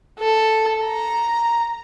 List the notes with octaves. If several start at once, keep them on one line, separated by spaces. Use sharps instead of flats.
A4
A#5